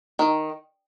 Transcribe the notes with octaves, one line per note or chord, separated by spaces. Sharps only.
D#3